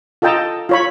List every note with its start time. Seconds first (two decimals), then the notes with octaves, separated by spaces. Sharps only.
0.22 F4 A4 D#5 G5 A5 A#5
0.69 F4 C#5 B5